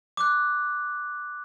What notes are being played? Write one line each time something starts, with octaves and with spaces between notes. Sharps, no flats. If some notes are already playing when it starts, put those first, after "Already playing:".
D6 F#6